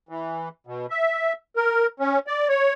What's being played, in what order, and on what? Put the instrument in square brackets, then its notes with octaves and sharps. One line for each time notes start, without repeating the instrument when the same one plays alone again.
[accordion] E3
B2
E5
A#4
C#4
D5
C#5